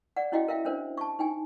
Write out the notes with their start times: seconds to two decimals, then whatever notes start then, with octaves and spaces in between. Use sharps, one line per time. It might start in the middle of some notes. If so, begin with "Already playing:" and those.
0.16 D5 F#5
0.32 C#4 E4 F#4 D#5 F5 G5
0.48 A#4 E5 F5 G5
0.65 C#4 D4 A#4 C5
0.97 A5 C#6
1.19 D#4 G5 G#5